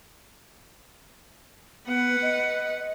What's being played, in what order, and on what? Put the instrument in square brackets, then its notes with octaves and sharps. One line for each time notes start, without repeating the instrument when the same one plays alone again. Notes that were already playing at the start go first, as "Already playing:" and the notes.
[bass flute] B3 [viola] B4 F#5
[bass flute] D#5